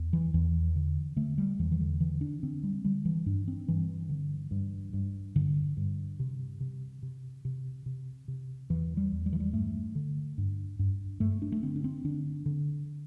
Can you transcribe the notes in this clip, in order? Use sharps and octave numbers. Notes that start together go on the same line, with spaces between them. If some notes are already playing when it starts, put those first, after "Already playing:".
Already playing: E2
E3
E2 E3
D3
D3 A3
G3
E2 E3
E3
D3
D3 E3
D4
D3 C4
G3
D3 G3
E3
G2 D4
C4
G2 E3
D3
G2
G2
G2 D3
G2
C3
C3
C3
C3
C3
C3
E2 E3
G3
E2
G3
E3
G3
G2 A3
D3
G2
G2
G2 A3
D4
A3
D3 C4
D4
C4
D3 D4
D3